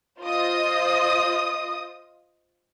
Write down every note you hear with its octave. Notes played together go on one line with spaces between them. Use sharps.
F4 C5 D#5 D#6